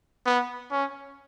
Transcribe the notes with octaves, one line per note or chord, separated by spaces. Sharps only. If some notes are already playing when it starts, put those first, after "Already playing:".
B3
C#4